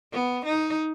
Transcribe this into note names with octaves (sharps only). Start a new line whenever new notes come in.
B3
D#4